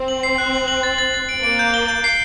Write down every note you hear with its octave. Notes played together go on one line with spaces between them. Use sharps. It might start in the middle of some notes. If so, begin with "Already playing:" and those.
Already playing: C4
F#7
C7
F#6
F#7
F#7
A6
A6
A6
D7
A#3 D7
G6
G7
G6
C7